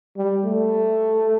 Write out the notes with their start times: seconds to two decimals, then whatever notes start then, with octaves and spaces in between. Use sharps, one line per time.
0.17 G3
0.45 A3